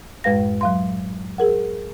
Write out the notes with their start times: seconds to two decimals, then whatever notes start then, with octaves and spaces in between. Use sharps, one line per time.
0.24 F#2 A2 G#3 B4 F5 A#6
0.61 F#3 F5 C6
1.38 G#4 A#4 F#5